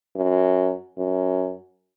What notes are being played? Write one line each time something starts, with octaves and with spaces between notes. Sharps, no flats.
F#2
F#2